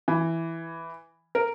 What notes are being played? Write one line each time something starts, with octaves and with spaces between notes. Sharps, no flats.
E3
A#4